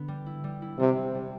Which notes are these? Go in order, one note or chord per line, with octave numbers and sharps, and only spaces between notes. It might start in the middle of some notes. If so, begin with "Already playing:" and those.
Already playing: D3 B3
G3
E4
G3
E4
C3 G3
E4
G3